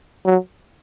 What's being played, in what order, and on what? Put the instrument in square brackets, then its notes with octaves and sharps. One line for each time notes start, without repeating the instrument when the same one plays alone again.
[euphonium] F#3